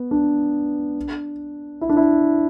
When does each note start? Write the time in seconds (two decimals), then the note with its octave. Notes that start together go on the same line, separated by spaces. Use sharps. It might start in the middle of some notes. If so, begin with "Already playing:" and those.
Already playing: B3
0.11 D4
1.81 E4
1.89 D4
1.97 E4